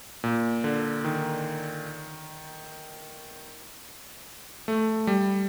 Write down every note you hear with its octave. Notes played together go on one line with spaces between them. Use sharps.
A#2
D3
D#3
A3
G3